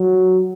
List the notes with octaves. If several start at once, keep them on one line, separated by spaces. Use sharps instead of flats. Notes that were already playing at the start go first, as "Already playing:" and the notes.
Already playing: F#3